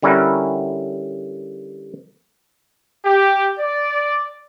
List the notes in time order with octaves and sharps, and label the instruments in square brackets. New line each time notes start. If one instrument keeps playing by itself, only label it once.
[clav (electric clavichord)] D3 G3 C#4 E4 A#4 F#5
[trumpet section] G4
D5